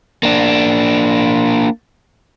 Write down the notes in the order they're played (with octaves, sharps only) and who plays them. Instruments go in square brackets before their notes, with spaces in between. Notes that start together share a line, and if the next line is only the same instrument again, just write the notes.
[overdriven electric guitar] A#3 D4